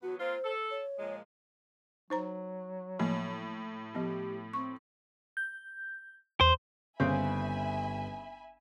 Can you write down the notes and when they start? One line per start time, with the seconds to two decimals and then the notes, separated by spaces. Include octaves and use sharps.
0.03 E2 F#3 B3 F#4
0.20 A#3 C4 F4 C5
0.44 A4
0.71 C#5
0.98 A#2 F3 G#3
2.10 F#3 D#4 C5 A#5
2.99 A2 F3 A#3
3.95 F3 B3 G4
4.53 C4 C#6
5.37 G6
6.41 E2 C5
7.00 G1 C#3 C4 E5 G#5 B5